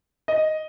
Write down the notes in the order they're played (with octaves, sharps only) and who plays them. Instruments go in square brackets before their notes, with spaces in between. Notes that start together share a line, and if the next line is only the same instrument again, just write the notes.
[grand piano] D#5